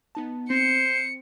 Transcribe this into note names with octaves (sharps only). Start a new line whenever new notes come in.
B3 D#4 A5
C4 C5 C#7